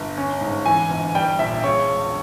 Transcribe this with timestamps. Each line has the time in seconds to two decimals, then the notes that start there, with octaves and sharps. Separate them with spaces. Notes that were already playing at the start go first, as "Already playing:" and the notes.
Already playing: G1
0.18 C#4
0.41 G#2
0.66 E3 G#5
0.90 G1
1.15 G3 G5
1.39 A#1 E5
1.63 C#3 C#5
1.89 E1